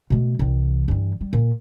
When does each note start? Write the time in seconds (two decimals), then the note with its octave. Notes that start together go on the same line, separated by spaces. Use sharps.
0.10 B2 A3
0.39 C2 E3
0.88 G2 E3
1.21 G3
1.33 A#2